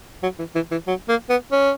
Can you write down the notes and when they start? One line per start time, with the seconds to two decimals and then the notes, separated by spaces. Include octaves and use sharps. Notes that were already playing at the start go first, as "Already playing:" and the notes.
0.23 F#3
0.39 E3
0.55 E3
0.71 E3
0.87 F#3
1.08 A#3
1.29 B3
1.52 C#4